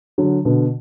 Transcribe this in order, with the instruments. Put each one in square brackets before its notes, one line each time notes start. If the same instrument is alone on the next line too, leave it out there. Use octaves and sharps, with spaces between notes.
[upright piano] D3 F#3
B2 D3